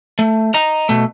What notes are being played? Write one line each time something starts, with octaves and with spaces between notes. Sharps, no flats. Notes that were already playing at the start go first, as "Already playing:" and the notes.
A3
D#5 A#5
B2 A3